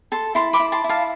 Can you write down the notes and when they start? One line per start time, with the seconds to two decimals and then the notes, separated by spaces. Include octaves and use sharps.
0.12 A4 A5 C6
0.35 E4 A5 C6
0.53 B5 D6
0.59 E4
0.72 A5 C6
0.84 E4
0.89 F5 A5